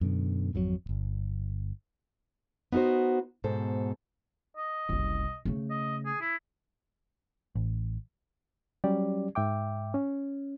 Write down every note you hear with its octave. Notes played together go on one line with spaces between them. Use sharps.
F#2 B2 D3
G#1 F2 D3 F#3
D1 G1
B3 D#4 F4 F#4 C5
G#2 B2 A4 C5
D#5
F#1 C2
C#3 A3
D#5
G#4
E4
A1
F#3 G3 C#4 G4 D5
G#2 E5 G5 D6
C#4